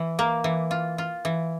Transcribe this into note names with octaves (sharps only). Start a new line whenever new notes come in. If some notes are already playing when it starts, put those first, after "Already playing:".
Already playing: E3
A#3
E3
F4
F4
E3